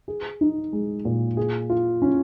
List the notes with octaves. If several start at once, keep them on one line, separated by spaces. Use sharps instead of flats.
G#4
D#4
G#3
A#2
G#4
F4
C#4